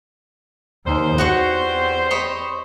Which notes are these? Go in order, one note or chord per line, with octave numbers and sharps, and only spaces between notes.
D#2 G3 C4 D#4 C5
E2 F#4 C#5 F#5
C#5 D#5 B5